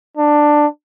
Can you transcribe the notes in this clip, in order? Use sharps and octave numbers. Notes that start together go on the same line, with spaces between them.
D4